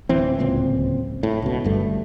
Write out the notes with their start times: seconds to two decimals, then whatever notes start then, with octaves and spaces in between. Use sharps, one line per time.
0.09 D1 E3 C4
0.39 D1 C#2 A#2 C4
1.23 A2
1.42 C#2 B2
1.64 G1 G2 A3